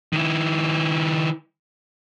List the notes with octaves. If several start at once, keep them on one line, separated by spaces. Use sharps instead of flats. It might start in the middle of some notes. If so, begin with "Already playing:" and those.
D#3 E4